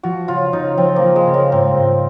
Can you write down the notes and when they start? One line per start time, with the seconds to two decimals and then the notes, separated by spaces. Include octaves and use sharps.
0.03 F3 F#4
0.28 C#3 F4
0.53 C#3 D#4
0.78 F3 C4
0.96 A#3
1.03 F3
1.16 G#3
1.27 C#3
1.34 A#3
1.52 G#2 C4
1.77 G#2